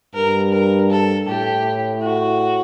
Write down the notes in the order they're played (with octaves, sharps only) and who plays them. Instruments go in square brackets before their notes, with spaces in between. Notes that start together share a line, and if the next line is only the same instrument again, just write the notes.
[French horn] G2 [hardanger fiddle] A#4
[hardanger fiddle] A#4
A4
[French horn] A2 [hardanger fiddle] G4
[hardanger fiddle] F#4